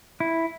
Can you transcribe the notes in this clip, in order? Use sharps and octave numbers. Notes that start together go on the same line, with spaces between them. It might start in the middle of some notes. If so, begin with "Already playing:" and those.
E4